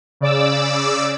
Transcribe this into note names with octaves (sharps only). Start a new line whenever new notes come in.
C#3 D5 D6 E6